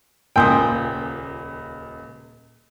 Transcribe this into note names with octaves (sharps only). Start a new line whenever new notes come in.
D#1 C#2 A#2 G5 G#5 C6 D#6